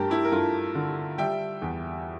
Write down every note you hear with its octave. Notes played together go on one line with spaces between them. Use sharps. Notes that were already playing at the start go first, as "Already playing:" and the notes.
Already playing: G2 A3 G4 A#4 A5
E4 G4
A#4
G2 F4 A4
D3
G3 E5 G5
E2